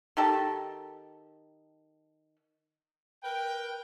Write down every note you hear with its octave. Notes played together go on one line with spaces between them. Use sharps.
D#3 G4 A4
A#4 B4 G5